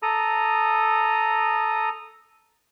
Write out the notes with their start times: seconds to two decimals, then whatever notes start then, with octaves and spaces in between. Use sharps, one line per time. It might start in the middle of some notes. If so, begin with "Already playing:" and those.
0.02 A4 A#5 D#6